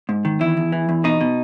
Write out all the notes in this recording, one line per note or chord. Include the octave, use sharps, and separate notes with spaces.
G#2
D#3
E2 E4
E2
E3
E2
B2 D#4
B2